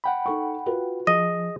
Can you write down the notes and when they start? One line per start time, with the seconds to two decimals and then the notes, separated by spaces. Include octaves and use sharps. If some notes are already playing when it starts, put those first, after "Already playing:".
0.04 F#5 G5 B5
0.26 D#4 A4 C#6
0.66 F4 F#4 B4
1.07 F3 G#4 D#5